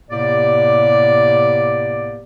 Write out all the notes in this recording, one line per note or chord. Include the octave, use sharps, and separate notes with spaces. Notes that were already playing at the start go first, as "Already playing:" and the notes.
A2 C3 A#3 B3 G4 D5